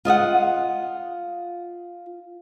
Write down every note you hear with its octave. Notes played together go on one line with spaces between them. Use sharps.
F4 D#5 E5 F#5